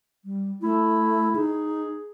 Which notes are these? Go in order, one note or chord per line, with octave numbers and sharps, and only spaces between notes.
G3
A3 E4
D#4 G#4